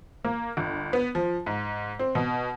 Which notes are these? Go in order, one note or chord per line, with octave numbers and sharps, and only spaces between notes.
A#3
G1
B3
F3
G#2
C4
B2